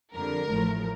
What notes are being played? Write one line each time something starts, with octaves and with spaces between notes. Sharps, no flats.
F2 D3 G3 A#4
A1 A2 F3 A3